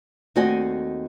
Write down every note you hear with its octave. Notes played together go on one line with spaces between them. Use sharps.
D#2 A3 C4 F#4 D#5 G#5